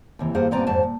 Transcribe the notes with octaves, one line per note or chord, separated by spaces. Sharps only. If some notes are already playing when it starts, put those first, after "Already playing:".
D#2 C3 E3
G2 A#3 G#4 C5 F#5
G2 A#2 B3 C4 D5 A#5
F2 G#2 F#3 C5 A5
A#2